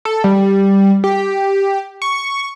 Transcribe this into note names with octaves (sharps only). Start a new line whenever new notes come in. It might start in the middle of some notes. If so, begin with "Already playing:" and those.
A4
G3
G4
C#6